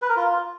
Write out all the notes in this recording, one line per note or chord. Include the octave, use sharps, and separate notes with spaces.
B4
A#4
F4